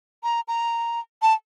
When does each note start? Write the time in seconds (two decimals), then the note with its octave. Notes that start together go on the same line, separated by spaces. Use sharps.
0.23 A#5
0.48 A#5
1.22 A5